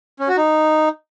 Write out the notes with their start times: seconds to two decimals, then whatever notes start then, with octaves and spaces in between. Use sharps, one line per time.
0.20 C#4
0.29 F#4
0.37 D#4